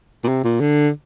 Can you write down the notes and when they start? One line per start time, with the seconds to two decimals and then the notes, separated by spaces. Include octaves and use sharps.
0.24 A#2
0.28 C3
0.44 A#2
0.60 D3